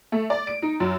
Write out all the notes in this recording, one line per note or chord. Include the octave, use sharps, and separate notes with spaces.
A3
D5
D7
D#4
F#2